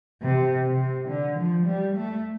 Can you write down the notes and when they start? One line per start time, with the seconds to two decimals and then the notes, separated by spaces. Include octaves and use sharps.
0.22 C3
0.66 C3
1.09 D3
1.38 F3
1.66 G3
1.96 A3